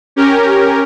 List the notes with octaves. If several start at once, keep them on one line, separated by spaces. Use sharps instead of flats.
C#4 G4 A#4